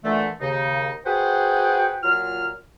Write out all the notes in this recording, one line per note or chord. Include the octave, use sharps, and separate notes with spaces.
A#2 D3 E3 A3
D#2 C#3 D#4
F#4 G#4 B4 C5 F#5 G5
A#2 F#3 F4 F6